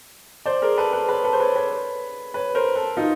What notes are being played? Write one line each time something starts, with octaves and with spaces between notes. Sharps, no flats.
C5 D5
G#4 A#4
A4 B4
A4 B4
B4 C#5
A4 B4
C5
B4 C#5
B4 C#5
B4 C#5
A#4 C5
A4 B4
D#4 F4